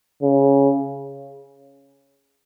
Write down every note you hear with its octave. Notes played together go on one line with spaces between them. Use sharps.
C#3